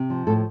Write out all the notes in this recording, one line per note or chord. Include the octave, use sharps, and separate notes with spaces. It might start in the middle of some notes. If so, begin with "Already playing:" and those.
Already playing: C3
F3
A2 A4